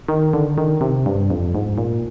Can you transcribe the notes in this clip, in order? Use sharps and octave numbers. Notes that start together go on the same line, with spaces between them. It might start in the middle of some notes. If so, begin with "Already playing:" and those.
D#3
D3
D#3
C3
G2
F2
G#2
A#2